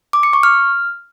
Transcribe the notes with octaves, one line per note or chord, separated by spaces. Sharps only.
D6
C#7
C#6
F6